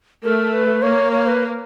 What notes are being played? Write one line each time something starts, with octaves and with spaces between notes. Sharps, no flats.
A3 A#4
B4
A#3 C#5
C#5
B4